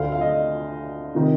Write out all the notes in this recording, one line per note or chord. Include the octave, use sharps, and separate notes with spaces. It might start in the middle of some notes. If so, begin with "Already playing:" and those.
Already playing: D2 D3 A3 F5
F5
D#5
C3 D#3